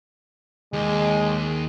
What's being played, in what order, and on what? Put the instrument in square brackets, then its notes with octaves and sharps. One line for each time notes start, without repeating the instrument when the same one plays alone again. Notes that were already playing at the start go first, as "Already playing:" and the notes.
[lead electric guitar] D#2 [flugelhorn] G#3